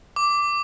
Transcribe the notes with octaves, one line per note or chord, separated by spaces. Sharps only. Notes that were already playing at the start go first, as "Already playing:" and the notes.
D6